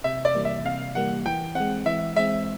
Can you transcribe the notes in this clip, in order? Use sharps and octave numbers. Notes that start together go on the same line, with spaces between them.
C3 E5
D5
E3 G3 A#3
E5
C3 F5
E3 G3 A#3 F#5
E3 G5
G#3 C4 F#5
E3 E5
G#3 C4 E5